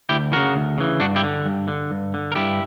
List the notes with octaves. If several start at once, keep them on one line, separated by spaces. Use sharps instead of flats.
D2 E4 G4
C#3 E3 F#4 A#4
D2
C#3 E3
G2 D4 F#4
E4 G4
D3
G2
D3
G2
D3
A#4
G2 E4 G4